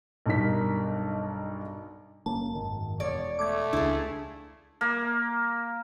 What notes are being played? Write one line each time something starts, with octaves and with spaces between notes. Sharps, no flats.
B1 G2 D#4 A#4 B6
F#1 A#3 C#4 A5
G#1 F#2 D#3
E1 C#5 D5
A3 D6 G#6
C#2 D4 E4 G#4
A#3